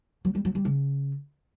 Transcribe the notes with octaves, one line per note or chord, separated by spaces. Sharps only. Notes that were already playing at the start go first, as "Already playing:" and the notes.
F#3
G3
F#3
G3
C#3